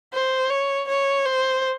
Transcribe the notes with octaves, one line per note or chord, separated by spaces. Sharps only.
C5
C#5
C#5
C5